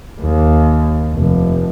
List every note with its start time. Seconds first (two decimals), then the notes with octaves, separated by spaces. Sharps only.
0.20 D#2
1.14 F1